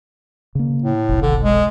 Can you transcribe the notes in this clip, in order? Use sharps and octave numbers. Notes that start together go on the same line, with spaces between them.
C#3 A#3
A2
F1 B1
D3
G#3